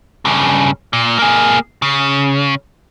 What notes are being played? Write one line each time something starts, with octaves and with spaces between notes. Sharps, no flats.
G2 C#3
A#2
A#3 G#4
C#3